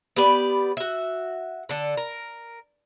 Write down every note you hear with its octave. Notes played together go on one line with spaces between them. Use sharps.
B3 G4 B4 D5
F#4 E5
D3 A4
A#4